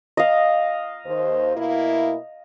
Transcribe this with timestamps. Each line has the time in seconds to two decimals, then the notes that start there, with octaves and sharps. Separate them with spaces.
0.17 D#5 F5
1.05 D#2 C5
1.55 B2 A#3 E4